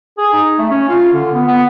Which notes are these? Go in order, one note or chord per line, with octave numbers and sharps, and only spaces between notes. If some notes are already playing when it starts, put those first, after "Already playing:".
G#4
D#4
A3
C#4
F4
D3
B3
B3